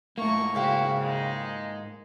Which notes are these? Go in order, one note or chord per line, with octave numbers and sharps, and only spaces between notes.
G#2 A3 A#3 A#4 C#6
C#3 E4 F#4 C5 F5 G5
G#3 D#4